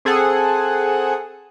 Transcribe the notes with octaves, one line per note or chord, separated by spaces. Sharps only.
C4 G#4 A4 F#5